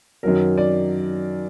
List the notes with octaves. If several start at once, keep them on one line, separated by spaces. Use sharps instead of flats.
F#2 D#3 F#3 A#4
D5